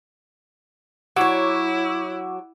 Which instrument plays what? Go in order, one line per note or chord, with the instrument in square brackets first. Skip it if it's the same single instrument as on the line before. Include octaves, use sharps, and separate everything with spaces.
[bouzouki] F#3 C#5 [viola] E4 [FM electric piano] F#5 D6 E6